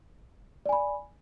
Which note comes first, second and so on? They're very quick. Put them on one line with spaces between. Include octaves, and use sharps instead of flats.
D5 G#5 B5